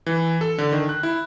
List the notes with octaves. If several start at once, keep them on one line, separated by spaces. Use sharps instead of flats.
E3
A4
D3
D#3
F#6
E4